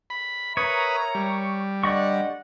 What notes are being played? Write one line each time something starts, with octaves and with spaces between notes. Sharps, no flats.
B5
A#4 B4 C#5 E5 A#5 D#6
G3
D3 D5 D#5 F#5 C#6